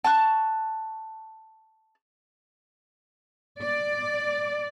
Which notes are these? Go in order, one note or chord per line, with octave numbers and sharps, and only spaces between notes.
A5 C#6 F#6
D5